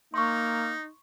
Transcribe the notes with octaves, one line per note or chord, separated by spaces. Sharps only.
A#3 D#4 C6 C#6